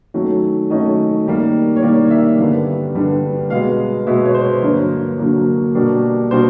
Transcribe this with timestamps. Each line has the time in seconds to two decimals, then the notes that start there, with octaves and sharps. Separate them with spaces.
0.14 D#3 F#3 A3 C#4
0.70 D#3 F#3 A3 C#4 D#5
1.26 D#3 G3 A#3
1.76 C#5
1.82 D#3 G3 A#3 D5
2.11 E5
2.38 G2 D3 G3 B3 F5
2.94 G2 D3 G3 B3
3.50 B2 G#3 B3 F5
4.07 B2 G#3 B3 E5
4.25 C#5
4.34 C5
4.63 G2 D3 F#3 A#3 C#5
5.19 G2 D3 F#3 A#3
5.75 B2 G3 A#3 D4
6.31 B2 G3 A#3 D4 C5